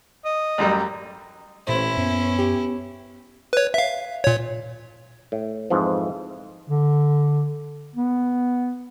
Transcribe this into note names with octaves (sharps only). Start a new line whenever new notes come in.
D#5
A1 F#2 G3
A1 A#2 C#4 E4 C5
F#2 B3
G4
B4 C#5
E5 F5
A#2 C#5
A2
F2 G#2 E3 F3
D3
B3